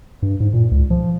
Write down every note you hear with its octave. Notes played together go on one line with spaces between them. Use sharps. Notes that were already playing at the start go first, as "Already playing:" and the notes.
G2
G#2
A#2
C#2
F3